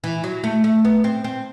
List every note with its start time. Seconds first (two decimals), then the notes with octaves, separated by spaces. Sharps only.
0.04 E3
0.24 F#3
0.44 A3
0.64 A3
0.85 B3
1.04 C4
1.24 C4